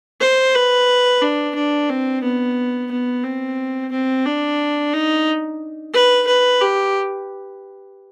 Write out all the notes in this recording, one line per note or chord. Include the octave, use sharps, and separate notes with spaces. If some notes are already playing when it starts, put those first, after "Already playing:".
C5
B4
D4
D4
C4
B3
B3
C4
C4
D4
D#4
B4
B4
G4